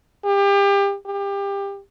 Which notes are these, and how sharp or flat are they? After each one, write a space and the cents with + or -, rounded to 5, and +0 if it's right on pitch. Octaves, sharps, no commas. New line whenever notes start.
G4 +30
G4 +25